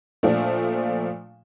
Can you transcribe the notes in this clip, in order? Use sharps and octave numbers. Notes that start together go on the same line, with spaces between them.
A#2 F3 A3 D4